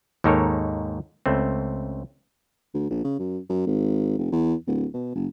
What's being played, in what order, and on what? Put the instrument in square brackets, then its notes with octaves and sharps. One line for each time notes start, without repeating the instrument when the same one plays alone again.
[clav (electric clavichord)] D#2 G#2 D#4 A4 A#4 C#5
C#2 A3 C4
[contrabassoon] D2
A#1
C#3
F#2
F#2
G#1
F1
E2
D1
B2
F#1